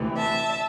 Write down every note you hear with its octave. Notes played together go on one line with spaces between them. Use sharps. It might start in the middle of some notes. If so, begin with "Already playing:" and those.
Already playing: D2 C3 E3
E5 A5